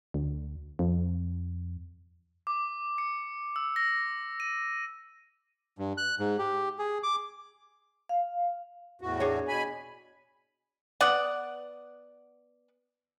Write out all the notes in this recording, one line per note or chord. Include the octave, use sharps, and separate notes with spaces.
D2
F2
D6
C#7
E6
A#6
D#7
G2
F#6
G#2
G4
G#4
D6
F5
E2 A2 F#4
D4 G#4 C#5
B2 G#5 B5
B3 D5 F#5